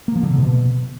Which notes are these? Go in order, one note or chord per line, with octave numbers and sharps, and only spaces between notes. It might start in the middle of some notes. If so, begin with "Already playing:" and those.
A#3
F3
D3
C3
B2